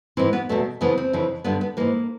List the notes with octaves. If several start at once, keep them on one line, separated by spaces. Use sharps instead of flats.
G#2 E3 C4
B3
E2 B2 A3
F2 C#3 E3 B3
C4
F2 C#3 E3
G2 D3 B3
B3
G#2 E3 A#3